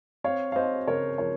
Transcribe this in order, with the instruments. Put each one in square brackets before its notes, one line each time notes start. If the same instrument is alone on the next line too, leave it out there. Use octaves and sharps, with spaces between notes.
[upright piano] C4 C#5 F5
F5
C4 C5 D#5
C#3 A#4 C#5
F3 A#4 C#5